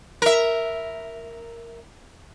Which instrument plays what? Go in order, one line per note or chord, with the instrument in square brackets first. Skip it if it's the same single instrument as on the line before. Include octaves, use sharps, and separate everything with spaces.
[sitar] A#4 E5